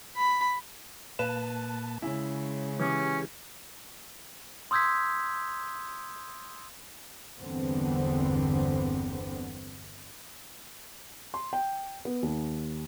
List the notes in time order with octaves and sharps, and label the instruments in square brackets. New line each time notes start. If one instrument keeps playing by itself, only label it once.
[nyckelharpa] B5
[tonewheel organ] A#2 A#3 A5 [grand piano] B4
[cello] C#3 G#3 [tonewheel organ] C#4 [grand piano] E4
[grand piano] E3 [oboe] C#4 [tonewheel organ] G4 G#4
[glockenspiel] C6 D#6 E6 G6 G#6 B6
[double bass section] G1 E2 D3 B3 C4
[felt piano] C6
G5
B3
D#2